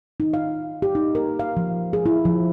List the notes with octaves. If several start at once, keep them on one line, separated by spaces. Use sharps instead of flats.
D#4
F5
G4
D#4
A#4
F5
F3
G#4
E4
F3